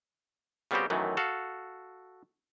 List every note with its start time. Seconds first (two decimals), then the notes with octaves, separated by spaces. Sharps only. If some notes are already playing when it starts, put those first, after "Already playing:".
0.71 C#3 G3 B3 C4 F#4 G4
0.90 F#2 D#3 E3 F#3 A3
1.17 F#4 A4 F5